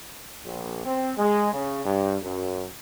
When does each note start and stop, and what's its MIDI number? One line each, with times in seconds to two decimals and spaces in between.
0.45 0.81 34
0.85 1.12 60
1.18 1.50 56
1.53 1.83 49
1.84 2.17 43
2.22 2.65 42